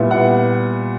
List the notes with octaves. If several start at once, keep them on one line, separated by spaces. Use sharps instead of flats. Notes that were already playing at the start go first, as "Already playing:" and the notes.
Already playing: A#2 G3 B3 E4
F#5